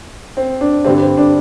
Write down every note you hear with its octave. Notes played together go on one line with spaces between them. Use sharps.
C4
D4
G2 D3 G3 C4
C4
D4